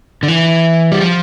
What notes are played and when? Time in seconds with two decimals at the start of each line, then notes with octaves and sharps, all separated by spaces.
0.23 D3
0.28 E3
0.92 G3
1.01 F3